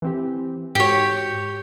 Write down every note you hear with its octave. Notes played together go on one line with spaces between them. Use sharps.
E3 C4 G4
G#2 F#4 G4 C#5